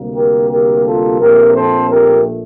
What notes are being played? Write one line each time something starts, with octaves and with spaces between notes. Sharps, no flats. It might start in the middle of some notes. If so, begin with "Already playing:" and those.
Already playing: D2 C3 G3 A#3
G4 A#4
G4 A#4
F4 A4
A#1 A#2 A3 C4 G4 A#4
A4 C5
G4 A#4